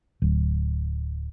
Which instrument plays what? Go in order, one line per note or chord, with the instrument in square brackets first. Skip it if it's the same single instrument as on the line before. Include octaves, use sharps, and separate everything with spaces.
[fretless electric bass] D1